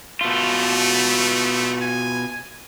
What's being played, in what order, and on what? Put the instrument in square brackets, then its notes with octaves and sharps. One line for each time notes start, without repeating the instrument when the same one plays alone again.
[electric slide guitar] B2 F4 [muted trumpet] A3
[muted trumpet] G#5